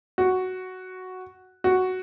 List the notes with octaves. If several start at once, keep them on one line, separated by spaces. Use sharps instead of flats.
F#4
F#4